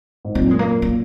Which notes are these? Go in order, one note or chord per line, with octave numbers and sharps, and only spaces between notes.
G#2
F#2 A#2 C4
G#3
A#3
A#3